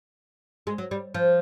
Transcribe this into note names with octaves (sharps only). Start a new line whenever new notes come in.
G#3
F#3
G3
F3